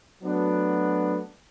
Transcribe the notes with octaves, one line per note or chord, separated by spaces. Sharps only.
F#3 A3 B3 D4 F#4